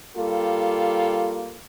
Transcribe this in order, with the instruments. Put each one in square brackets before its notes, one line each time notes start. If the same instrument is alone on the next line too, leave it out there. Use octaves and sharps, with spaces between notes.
[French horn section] G3 A#3 F4 G4 A4